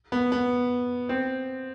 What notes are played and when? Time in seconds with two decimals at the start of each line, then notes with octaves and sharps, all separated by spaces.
0.12 B3
0.32 B3
1.09 C4